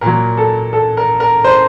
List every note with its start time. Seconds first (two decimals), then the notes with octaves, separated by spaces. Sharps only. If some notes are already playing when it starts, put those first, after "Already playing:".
0.01 A#2 F#3 A#4
0.37 A4
0.73 A4
0.97 A#4
1.20 A#4
1.44 C5